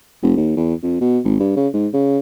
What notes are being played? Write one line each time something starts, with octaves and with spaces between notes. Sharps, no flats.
F1
D#2
E2
F2
B2
G#1
G2
C#3
G#2
C#3